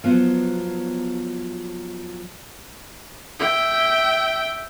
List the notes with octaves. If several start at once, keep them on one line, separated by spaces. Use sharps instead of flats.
F3 F#3 B3
E5 G5